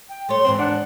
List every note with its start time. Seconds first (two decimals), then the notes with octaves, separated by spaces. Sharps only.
0.09 G5
0.29 A3 C#5 C6
0.45 D#2 G#2 E3 C4
0.59 D4 F#5